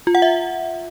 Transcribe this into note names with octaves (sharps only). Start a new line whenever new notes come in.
F4
F#5
E5